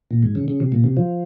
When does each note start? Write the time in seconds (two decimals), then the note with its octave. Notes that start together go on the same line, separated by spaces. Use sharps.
0.11 A#2
0.23 G#2
0.35 C#3
0.48 C#3
0.60 C3
0.72 A#2
0.84 C3
0.97 F3